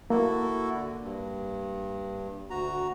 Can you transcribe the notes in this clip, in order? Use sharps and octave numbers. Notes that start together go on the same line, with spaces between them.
A#3 E4 F#4 A4
D3
G2
D2 F#4 A#5